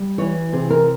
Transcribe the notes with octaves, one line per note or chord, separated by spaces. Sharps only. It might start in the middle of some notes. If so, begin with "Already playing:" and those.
Already playing: G3
E3 C#5
C3 G#4
A#4